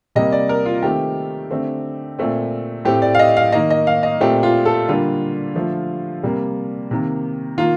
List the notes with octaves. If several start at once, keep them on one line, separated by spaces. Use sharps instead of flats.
C3 G3 A#3 D#5
D5
A#4
F4
D#3 A3 C4 G4
D3 A3 C4
A#2 A3 C4
A2 A3 C4 G4
D5
F5
D#5
F5
D#3 A#3 D#5
D#5
F5
D#5
A#2 A3 C4 G4
F4
A4
D3 G3 A#3 F4
D3 F3 A3
C3 G3 A#3
C3 D#3 A#3
D#3 A#3 F4